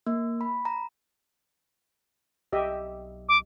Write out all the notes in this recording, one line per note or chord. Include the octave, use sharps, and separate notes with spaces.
A#3
B5
A#5
B1 G4 D#5 E5
D6